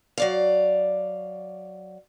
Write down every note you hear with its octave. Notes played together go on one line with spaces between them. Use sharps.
F#3 D5 F5